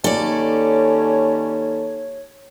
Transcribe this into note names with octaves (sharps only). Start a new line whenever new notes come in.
D#2 C#4 A4 C#5 D5